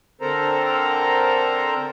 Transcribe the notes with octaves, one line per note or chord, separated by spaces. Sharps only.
D3 C4 A4 A#4 C5 A#5